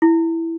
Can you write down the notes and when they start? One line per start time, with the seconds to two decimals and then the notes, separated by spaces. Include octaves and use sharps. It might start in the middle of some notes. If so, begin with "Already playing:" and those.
0.02 E4